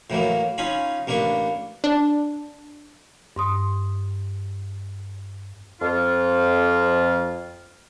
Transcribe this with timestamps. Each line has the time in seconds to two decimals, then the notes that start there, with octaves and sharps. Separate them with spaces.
0.10 A2 E3 F#3 A#3
0.58 C#4 D#4 F4 G#5 B5
1.07 A1 A#3 D4 B4 C#6
1.84 D4
3.36 G2 C6 D#6
5.81 F2 F4